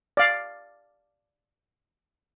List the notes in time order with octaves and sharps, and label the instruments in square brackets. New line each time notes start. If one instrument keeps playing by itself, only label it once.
[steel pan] D5 F5